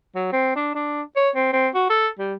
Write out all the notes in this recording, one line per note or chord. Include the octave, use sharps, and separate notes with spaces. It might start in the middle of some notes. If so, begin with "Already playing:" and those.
F#3
C4
D4
D4
C#5
C4
C4
F#4
A4
G3